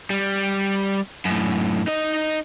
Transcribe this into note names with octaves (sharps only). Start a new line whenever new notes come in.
G3
F#2 A2
D#4 D#5